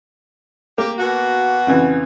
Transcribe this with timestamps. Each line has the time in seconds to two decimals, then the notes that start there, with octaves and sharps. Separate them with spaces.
0.78 A#3 G4
0.98 B2 F#4
1.67 F2 C#3 E3